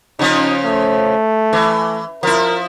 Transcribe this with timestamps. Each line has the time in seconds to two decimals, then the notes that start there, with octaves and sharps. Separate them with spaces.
0.19 C#3 F3 C#4 D#4
0.64 A3
1.53 E3
2.23 F3 E4 A#4